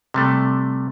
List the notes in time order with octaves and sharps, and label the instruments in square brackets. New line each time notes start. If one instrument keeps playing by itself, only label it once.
[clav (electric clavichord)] C3 G3 A3